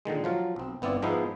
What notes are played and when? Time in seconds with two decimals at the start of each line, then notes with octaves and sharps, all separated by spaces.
0.05 A#2 D3 D#3 G#3
0.24 F3 F#3 F4
0.56 B1 C4
0.82 G1 B3 C4 E4 D5
1.02 G#2 F3 G#3 B3 D#4 E4